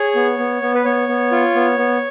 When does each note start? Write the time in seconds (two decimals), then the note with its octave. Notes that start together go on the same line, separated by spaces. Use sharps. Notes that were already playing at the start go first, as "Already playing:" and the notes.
Already playing: G#4 C#5
0.15 B3
0.39 B3
0.62 B3
0.75 B4
0.85 B3 C#5
1.09 B3
1.32 F4
1.55 B3
1.78 B3